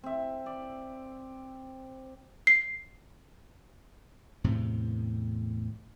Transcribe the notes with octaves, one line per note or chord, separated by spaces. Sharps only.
C4 E5
D5
C7
E2 A2 C3 C4